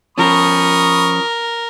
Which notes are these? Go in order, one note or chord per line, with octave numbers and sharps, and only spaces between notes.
F3 C#4 A#4 B5 C#6 D#6